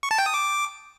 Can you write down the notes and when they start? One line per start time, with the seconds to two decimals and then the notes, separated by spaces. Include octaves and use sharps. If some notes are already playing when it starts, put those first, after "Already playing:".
0.03 C#6
0.11 A5
0.18 G5
0.26 D#6
0.34 D6